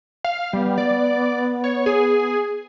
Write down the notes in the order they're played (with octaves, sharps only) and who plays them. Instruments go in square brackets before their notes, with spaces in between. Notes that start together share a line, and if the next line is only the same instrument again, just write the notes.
[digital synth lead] F5
[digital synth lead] G3 [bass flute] B3
[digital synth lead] D5
C#5
G#4